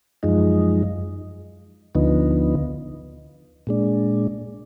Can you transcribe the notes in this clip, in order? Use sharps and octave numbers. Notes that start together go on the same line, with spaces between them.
F#2 F3 G#3 D#4
D2 D3 F3 B3 D#4
A#2 G#3 D4